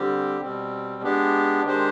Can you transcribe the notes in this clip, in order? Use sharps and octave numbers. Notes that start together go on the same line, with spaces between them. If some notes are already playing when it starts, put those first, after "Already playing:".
Already playing: D3 G3 C4 G4
B2 G3 C4
G#3 B3 D4 G4
D#3 G#3 D4 G4 C5